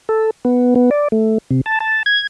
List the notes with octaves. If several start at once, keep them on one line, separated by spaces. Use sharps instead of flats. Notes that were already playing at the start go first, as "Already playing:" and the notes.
A4
B3
B3
D5
A3
C3
A5
A5
G#6